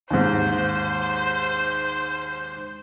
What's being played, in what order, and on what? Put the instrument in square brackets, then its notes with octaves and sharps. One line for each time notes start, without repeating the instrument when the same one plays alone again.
[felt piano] D#2 G#2 [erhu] C5